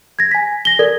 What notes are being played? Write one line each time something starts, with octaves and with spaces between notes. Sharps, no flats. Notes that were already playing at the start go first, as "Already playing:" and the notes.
G#6 A#6
G#5 B6
A#6 G7
A4 A#4 D5 G#6